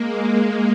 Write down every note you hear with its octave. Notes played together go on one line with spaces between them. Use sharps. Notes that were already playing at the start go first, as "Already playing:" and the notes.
Already playing: G#3 A#3